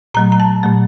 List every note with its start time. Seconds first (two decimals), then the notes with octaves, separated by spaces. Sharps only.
0.14 A#2 F#3 A3 A#5
0.32 A#5
0.40 A5
0.63 A#2 F#3 A3